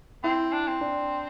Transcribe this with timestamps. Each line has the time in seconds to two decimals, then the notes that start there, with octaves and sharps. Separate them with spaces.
0.23 C4 E4
0.52 D4
0.67 C4
0.81 D4